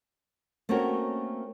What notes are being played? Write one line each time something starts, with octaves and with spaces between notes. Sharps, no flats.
A3 A#3 C4 C#4 F#4 A#4